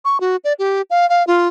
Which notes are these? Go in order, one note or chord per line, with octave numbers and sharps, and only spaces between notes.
C#6
F#4
D5
G4
F5
F5
F4